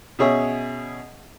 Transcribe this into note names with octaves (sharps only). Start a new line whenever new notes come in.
B2 C#4 G#4 C#5 E5